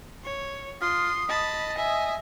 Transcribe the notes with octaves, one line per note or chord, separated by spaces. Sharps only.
C#5
F4 C6 D#6
D#5 A5 B5
E5 G#5